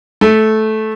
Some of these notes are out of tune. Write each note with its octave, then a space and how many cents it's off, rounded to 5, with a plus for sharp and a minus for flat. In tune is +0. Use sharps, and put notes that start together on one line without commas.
A3 -15